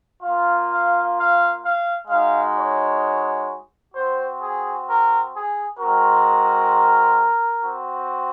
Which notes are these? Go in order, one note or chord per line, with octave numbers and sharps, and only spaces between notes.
A#3 F4 F5
F5
F5
F5
G#3 D#4 F#4 F5
C#5
C4 F#4 C5
G#4
A#4
G#4
G#3 C4 F#4 A#4
C4 F#4